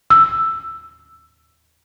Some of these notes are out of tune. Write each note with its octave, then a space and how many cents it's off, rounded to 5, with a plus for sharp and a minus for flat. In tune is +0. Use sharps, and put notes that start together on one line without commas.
E6 +10